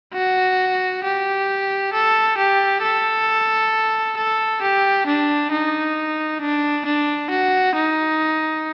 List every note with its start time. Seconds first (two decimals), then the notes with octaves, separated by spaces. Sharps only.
0.14 F#4
1.04 G4
1.93 A4
2.38 G4
2.83 A4
4.17 A4
4.62 G4
5.06 D4
5.51 D#4
6.41 D4
6.85 D4
7.30 F#4
7.75 D#4